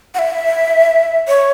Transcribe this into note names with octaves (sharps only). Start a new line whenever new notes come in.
F#5
E5
C#5